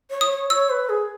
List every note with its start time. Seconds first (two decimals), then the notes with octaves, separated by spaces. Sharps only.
0.11 C#5
0.21 D#6
0.31 C#5
0.50 C#5 E6
0.70 B4
0.89 G#4